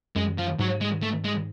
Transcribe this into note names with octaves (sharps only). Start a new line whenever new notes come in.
F#2 G#3
F3
G#2 F#3
G#3
A3
G#3